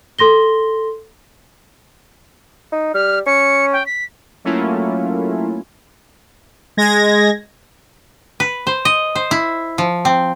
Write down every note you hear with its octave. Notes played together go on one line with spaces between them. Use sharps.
A4 C6 A#6 G7
D#4
G3 F6
C#4 C#7
G5
B6
F#3 A3 A#3 C#4 E4 F4
G#3 G#6 A#6
B4
C5
D#5
C5
E4
F3
C4